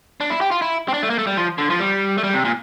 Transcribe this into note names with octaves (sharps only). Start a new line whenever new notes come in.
D4
E4
G4
F4
E4
C4
D4
A3
A#3
A3
G3
F3
D3
F3
G3
A3
G3
C3
A#2